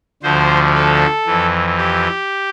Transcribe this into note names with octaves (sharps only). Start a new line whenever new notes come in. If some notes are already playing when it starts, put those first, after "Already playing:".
D2 D3 F3 C5
A4
F2 E3
G4